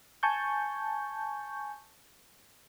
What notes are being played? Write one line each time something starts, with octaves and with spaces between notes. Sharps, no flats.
G#5 A5 C#6 G6